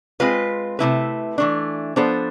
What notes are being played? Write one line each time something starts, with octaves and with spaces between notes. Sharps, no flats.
G#3 C4 F4 B4
C3 F3 A3 E4 B4
E3 A3 D4
F3 B3 D4 A4 C5